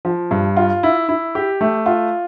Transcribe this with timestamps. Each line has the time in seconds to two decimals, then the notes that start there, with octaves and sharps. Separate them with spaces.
0.05 F3
0.31 G2
0.57 F4
0.83 E4
1.09 E4
1.35 G4
1.61 A3
1.86 F4